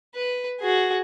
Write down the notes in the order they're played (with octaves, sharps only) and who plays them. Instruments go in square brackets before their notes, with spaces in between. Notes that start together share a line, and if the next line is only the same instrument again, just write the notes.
[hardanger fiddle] B4
F#4 G#4